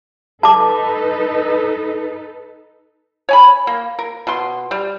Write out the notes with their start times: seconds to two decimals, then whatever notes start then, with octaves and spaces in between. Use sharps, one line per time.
0.43 D#4 A4 B4 A5 D6
3.29 C#5 G#5 B5
3.67 A#3
3.99 A#4
4.27 B2 C6
4.71 G3